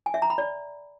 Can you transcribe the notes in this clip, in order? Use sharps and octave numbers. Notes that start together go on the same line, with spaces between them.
G#5
E5
A#5
B5
D5